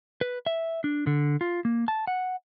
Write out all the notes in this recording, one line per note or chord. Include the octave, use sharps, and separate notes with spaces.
B4
E5
D4
D3
F4
A#3
A5
F#5